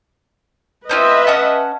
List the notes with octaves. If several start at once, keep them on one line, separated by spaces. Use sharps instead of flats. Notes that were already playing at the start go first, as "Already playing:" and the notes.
C4 C#4 F4 B4 D#5 E5
C#4 F#5 A5